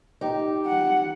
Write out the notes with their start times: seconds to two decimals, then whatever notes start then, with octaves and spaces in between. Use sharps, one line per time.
0.21 D#4 G4
0.66 F#5